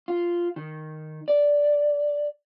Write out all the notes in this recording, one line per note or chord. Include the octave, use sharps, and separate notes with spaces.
F4
D#3
D5